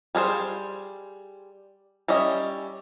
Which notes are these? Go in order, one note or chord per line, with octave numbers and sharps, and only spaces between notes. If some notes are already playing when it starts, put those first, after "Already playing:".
G3 G#4 A#4 C5
G3 C#4 D#5 E5